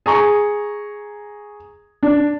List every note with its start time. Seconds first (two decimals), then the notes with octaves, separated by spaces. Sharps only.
0.06 G#4 A#5 C#6
2.03 D4